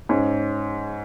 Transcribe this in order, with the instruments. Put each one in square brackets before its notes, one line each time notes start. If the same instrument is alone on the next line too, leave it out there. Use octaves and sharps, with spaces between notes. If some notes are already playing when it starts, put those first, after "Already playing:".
[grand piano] G#2 G#3 C#4